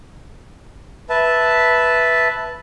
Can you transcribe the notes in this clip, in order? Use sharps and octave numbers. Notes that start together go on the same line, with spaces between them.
B4 E5 A5